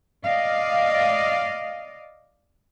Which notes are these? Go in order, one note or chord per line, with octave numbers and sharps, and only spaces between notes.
D5 D#5 F5